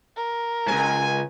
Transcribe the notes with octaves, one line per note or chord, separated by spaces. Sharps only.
A#4
C#2 G#2 G#5